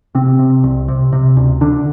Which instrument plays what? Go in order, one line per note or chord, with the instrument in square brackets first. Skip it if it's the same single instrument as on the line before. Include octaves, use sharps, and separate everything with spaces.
[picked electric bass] C3 C4
C3
C2
C3
C3
D2
D3 D4